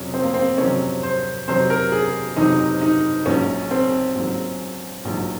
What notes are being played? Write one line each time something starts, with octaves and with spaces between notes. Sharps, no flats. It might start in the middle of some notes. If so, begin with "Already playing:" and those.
Already playing: F2 C3 F#3 C#4
C4
A#3
C4
F2 C3 F#3 C#4
C5
F2 C3 F#3 C5
A#4
G#4
F2 C3 F#3 D#4
D#4
A#1 G#2 F#3 C#4
C4
A#1 G#2 F#3
A#1 G#2 F#3